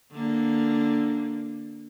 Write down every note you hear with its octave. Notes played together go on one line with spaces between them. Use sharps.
D3 A#3